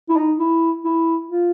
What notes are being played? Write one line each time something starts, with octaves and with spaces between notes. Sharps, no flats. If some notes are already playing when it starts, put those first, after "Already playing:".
E4
D#4
E4
E4
F4